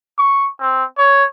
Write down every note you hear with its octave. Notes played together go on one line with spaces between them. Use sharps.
C#6
C4
C#5